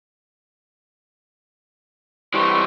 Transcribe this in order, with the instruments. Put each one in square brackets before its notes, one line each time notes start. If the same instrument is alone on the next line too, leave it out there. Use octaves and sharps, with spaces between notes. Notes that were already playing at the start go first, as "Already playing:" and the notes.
[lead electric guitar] E3 G3 [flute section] C6 C#6